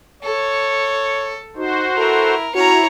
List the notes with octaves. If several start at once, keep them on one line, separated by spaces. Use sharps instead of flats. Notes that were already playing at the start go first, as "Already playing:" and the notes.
A4 C#5
D#4 F#4 C5
E4 A4 A#4
C#4 E4 F#4 C#5 A#5